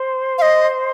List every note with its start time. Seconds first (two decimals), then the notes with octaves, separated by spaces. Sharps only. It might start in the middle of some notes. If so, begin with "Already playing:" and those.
Already playing: C5 C6
0.38 F5
0.42 D#5